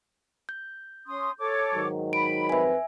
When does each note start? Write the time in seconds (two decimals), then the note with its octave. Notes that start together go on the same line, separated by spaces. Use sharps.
0.49 G6
1.07 C#4 C6 D#6
1.39 A4 C#5 D6
1.74 G#2 D#3 F#3
2.13 B5 D7
2.49 F2 C4 B4 E5 G#5